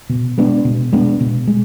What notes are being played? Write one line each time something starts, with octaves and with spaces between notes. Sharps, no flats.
B2
G#3 B3 D4
B2
G#3 B3 D4
B2
G#3